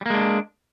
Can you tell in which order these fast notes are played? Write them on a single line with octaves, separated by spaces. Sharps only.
G3 A#3 G#3 D4